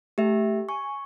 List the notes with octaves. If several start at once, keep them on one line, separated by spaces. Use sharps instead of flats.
A3 G4 E5
G#5 C#6